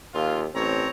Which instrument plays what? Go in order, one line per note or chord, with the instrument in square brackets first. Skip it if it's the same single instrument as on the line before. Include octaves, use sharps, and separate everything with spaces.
[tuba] D#2 [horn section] F4
[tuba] A1 [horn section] C4 C#5 A#5